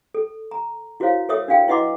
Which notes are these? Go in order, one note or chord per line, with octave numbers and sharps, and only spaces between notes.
A4
A#5
E4 F#4 A#4 C5 C#5 F5
A4 A#4 C#5 E5 D#6 E6
D4 F#4 F5 G5
E4 B4 D#5 F#5 C6 D6